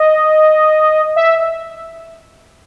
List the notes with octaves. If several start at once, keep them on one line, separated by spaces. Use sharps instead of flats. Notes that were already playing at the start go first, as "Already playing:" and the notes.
Already playing: D#5
E5